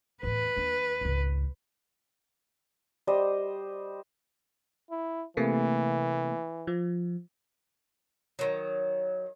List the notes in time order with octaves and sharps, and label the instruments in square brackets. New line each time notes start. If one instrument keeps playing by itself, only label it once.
[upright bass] E2 A2 [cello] B4
[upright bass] D#2 D4
G#1 C#2
[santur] G3 C5 D#5
[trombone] E4
[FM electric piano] C3 A3 A#3 [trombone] E3
[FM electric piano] F3
[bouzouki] D#3 F#3